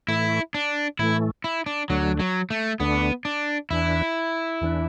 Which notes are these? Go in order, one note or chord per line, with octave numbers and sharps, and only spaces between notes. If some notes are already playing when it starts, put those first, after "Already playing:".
A2 E3 A3 E4
D4
A2 E3 A3 E4
E4
D4
D2 D3 F#3 A3 D4
F#3
A3
D2 D3 A3 B3 D4
D4
E2 E3 D4 E4
E2 E3 D4